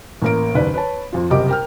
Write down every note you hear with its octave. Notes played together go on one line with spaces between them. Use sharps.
A1 A#3 A#4 D7
F#1 D#2 B4 D5 B5
B4 C#5 A5
F2 F4
F#1 C2 G4 A#4 D#5 D6
A#4 G5 F6